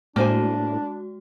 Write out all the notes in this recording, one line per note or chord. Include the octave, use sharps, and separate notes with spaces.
A2 G#3 A#3 D4 F#4 C5 G#5